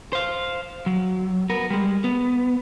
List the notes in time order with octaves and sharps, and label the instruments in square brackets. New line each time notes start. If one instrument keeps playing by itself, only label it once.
[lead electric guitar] C5 F5
F#3
B3 A#4
G3 G#3
B3